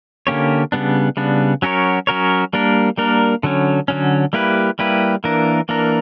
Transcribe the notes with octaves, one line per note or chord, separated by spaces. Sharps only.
D3 A#3 C#4 G4 C#5
C#3 G3 B3 D4
C#3 G3 B3 D4
F#3 C#4 F#4 A#4 C#5
F#3 C#4 F#4 A#4 C#5
G3 A#3 D4 A#4
G3 A#3 D4 A#4
D3 F#3 C#4
D3 F#3 C#4
G3 A#3 E4 G4 B4
G3 A#3 E4 G4 B4
E3 A#3 D4 A#4
E3 A#3 D4 A#4